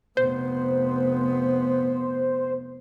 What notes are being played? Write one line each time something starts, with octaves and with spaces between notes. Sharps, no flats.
F1 B3 C5